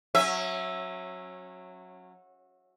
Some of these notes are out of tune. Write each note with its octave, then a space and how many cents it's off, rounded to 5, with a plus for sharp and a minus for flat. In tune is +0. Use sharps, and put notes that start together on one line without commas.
F#3 -15 C#4 -25 E5 +0